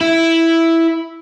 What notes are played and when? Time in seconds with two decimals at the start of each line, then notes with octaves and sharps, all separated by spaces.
0.01 E4